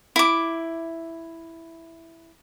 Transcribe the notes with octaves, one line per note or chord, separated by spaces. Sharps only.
E4 D6